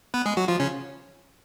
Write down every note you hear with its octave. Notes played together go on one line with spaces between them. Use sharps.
B3 B4
G#3 G#4
F#3 F#4
F3 F4
C#3 C#4